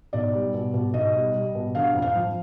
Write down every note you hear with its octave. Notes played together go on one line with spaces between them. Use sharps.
B1 D5
G3
B2
B2
B1 D#5
G3
G3
B2
D3 F5
F2
F5
F3